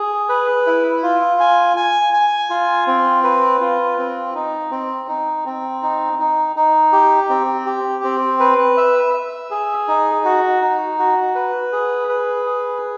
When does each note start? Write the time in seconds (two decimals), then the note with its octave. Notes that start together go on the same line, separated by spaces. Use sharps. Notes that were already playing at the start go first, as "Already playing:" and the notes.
Already playing: G#4
0.29 B4
0.67 E4
1.03 F4
1.40 G#5
1.77 G#5
2.13 G#5
2.50 F4
2.87 C4
3.24 B4
3.61 F4
3.98 C4
4.35 D#4
4.71 C4
5.08 D#4
5.45 C4
5.82 D#4
6.19 D#4
6.56 D#4
6.92 G4
7.29 C4
7.66 G4
8.04 C4
8.40 B4
8.77 E5
9.14 E5
9.51 G#4
9.88 D#4
10.25 F#4
10.62 D#4
10.99 F#4
11.35 B4
11.72 G#4
12.09 B4
12.46 G#4